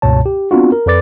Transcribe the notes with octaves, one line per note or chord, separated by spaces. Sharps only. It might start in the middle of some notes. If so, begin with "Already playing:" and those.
C#2 G2 B2 C#5 A5
G4
B3 C4 D4 F4 F#4
A#4
F2 A4 B4 D5 D6 A6